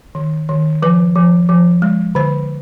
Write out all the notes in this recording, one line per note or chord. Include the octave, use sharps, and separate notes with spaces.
D#3
D#3
F3 B4
F3
F3
G#3
D3 C5